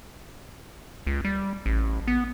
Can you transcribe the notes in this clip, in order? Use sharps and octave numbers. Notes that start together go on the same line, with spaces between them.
C#2
G3
A1
B3